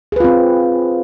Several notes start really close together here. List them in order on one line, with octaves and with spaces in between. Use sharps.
G#4 B4 F4 C4